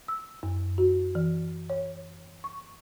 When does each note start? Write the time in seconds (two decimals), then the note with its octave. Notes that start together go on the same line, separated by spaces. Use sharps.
0.08 E6
0.43 F#2
0.78 F#4
1.15 E3
1.70 C#5
2.44 C#6